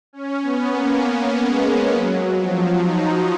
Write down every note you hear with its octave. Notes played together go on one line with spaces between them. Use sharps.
C#4
B3
A#3
A#3
G#3
F#3
F3
D#4